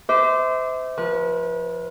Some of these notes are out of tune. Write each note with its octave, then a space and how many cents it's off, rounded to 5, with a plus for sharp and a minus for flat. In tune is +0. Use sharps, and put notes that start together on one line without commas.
C5 -30 E5 -35 D6 +5
F3 +0 B4 -35